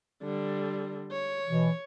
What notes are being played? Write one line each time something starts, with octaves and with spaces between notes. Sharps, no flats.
D3 G3
C#5
B2 E3